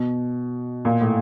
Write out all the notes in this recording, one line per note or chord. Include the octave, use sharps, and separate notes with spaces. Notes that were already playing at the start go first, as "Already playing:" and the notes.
Already playing: B2
A#2
A2